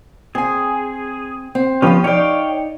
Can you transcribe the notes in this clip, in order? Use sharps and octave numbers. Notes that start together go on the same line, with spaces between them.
C4 G#4 G#5
C4
F3 B3 C#4 F4 G4
D#4 C#5 D5 F5 G5